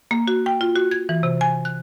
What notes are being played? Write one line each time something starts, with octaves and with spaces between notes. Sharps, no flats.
A#3
F#4
G5
F4
F#4
G#6
E3
C3
G#5
F#6